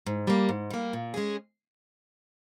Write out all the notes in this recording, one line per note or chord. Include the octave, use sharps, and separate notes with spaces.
G#2
G3 A#3
G#2
G3 A#3
A#2
G#3 C#4 G#4